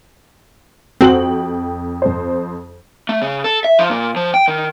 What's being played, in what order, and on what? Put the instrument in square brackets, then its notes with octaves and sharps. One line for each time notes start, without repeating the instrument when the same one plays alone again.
[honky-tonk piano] F2 G5 F#7 [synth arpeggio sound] C4 F#4
[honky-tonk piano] F2 C5
[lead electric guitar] A3
C#3
A4
E5
F3
A#2
F3
G5
D#3